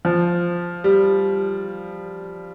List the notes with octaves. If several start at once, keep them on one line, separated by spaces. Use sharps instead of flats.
F3
G3